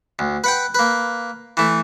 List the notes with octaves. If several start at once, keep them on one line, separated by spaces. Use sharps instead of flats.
D2
B4 F#5 G5
A#3 B4
E3 A3